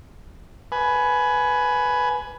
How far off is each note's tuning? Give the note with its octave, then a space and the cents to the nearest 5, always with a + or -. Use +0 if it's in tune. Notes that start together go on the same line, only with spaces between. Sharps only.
B4 +0 G#5 +20